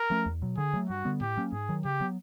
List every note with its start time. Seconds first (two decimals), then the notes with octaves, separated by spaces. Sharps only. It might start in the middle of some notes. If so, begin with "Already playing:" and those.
Already playing: A#4
0.10 F3 A3 C#4
0.26 E2
0.42 B2 F#3
0.57 D3 G#4
0.73 F#3 A3
0.89 G2 F#4
1.05 D3 G3 B3
1.21 A2 G4
1.37 F#3 A#3 C#4
1.53 G#2 G#4
1.69 D#3 F#3
1.85 C#3 G4
2.00 F#3 B3